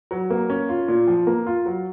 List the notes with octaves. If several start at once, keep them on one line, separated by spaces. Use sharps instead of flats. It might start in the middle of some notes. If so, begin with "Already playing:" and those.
F#3
A#3
C#4
F4
A#2
F3
A#3
F4
F#3